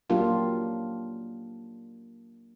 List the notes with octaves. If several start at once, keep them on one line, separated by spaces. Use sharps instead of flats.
F#3 A#3 D4 F4 G4